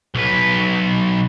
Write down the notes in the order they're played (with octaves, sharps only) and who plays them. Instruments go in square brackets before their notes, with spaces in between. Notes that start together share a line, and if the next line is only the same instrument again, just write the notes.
[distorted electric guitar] B1 B4